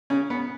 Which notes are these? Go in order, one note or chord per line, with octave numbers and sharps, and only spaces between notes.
C#3 C#4
B3